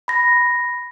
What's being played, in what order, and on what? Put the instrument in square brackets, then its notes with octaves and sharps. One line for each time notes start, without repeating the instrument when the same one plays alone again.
[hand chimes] B5 A#6